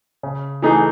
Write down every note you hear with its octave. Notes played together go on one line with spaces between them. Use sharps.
C#3
E3 A3 D#4 G#4